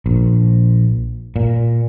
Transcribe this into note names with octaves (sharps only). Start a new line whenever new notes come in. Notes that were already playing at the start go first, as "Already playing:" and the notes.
A#1
A#2